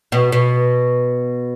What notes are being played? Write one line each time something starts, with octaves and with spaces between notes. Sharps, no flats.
B2
B2